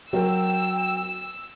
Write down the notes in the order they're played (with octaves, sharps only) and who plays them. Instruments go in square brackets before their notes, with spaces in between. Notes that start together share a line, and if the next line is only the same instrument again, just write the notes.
[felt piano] F#3 A#4 [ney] G5 [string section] E6